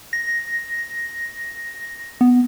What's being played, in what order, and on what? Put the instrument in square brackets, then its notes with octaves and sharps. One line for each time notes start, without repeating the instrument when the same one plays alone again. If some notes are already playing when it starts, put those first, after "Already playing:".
[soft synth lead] A#6
B3